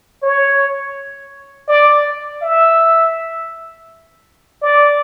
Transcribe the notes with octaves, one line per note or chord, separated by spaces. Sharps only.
C#5
D5
E5
D5